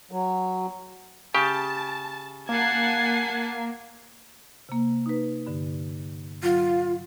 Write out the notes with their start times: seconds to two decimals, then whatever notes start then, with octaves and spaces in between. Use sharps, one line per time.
0.11 F#3
1.34 C#3 G4 A5
2.49 A#3 F#5 G#5 A5 G#6 C7
4.69 C3 A#3
5.06 D#4 B4
5.46 G2 D3
6.43 F#3 F4